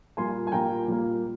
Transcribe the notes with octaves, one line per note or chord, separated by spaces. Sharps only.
A#2 G3 A#3 G#5 C6
G#5
A#2 G3 A#3 G5 A#5
A#2 G3 A#3